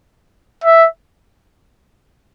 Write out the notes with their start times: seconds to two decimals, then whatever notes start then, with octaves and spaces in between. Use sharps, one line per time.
0.64 E5